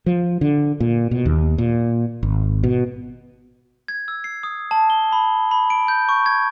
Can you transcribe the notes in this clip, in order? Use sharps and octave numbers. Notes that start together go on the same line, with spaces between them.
F3
D3
A#2
B2
D#2
A#2
G#1
B2
G#6
E6
C7
D#6
A5
G7
B5
B5
D7
G6
C#6
G#6